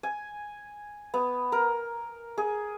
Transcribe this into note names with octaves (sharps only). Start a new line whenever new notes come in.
G#5
B3
A#4
G#4